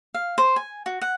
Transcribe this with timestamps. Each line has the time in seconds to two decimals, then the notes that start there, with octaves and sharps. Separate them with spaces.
0.14 F5
0.38 C5
0.56 G#5
0.86 F#4
1.02 F#5